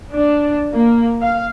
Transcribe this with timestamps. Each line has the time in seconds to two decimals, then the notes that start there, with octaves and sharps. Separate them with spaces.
0.13 D4
0.71 A#3
1.21 F5